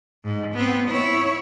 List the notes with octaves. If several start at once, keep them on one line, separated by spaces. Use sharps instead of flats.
G#2
B3 C4
E4 C#5